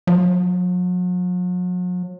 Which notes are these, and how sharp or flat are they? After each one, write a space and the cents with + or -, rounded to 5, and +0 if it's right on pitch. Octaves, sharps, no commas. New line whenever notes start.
F#3 -45